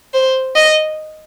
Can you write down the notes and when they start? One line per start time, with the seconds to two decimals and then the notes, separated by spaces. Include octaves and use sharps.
0.14 C5
0.56 D#5